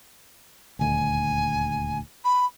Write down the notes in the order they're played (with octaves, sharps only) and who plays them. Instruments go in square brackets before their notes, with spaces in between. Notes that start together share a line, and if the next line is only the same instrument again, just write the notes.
[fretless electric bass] D#1 D2 [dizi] G#5
[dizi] B5